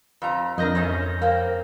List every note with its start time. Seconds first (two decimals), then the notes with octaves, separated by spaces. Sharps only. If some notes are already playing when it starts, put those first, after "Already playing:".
0.22 F2 A#5
0.58 F2 D4 A#4 D#5 G6 A#6
0.75 G#2 A3 C#4
1.22 A#3 C4